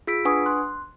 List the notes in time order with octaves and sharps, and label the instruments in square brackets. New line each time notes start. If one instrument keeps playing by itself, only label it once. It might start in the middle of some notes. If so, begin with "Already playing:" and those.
[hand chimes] F4 G#4 E6 B6 D7
D4 B4 F#5 G#5 C#6 D#6
C6 F#6